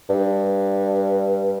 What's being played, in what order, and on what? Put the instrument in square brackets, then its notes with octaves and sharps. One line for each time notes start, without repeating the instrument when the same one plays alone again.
[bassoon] G2